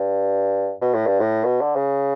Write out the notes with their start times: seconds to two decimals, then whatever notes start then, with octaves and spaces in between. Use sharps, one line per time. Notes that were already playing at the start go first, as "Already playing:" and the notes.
Already playing: G2
0.81 B2
0.94 A2
1.07 G2
1.20 A2
1.45 B2
1.61 D3
1.76 C#3